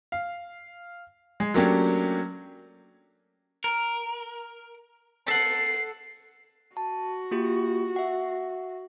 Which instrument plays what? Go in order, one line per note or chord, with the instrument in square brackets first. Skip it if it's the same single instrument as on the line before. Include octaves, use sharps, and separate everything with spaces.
[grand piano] F5
G#3
F#3 A3 A#3 C#4 D4 G4
[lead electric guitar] A#4
[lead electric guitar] A4 F#5 [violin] C7
[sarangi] F#4 [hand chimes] A5
[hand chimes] A#3 F4 G4
E5 F#5